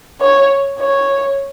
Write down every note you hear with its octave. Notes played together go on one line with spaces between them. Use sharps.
C#5
C#5